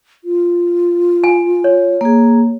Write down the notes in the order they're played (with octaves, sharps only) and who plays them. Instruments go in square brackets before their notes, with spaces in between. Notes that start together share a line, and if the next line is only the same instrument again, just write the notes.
[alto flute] F4
[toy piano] G#5
C#5
[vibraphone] A#3 G#4